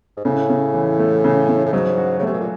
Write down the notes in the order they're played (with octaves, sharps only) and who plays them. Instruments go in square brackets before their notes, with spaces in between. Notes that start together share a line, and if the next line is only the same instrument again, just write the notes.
[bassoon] G#2
[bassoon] A2 [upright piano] C#3
[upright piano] C#3
E3
A3
C#3
C#3
[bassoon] A2
[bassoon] G#2 [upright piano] F#3
[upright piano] F#4
[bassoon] C#3
[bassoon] C3 [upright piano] A3
[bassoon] B2
A#2